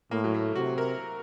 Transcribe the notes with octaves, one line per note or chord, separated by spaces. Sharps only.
A2 A#3
F#3
A3
C3 F#4
A#4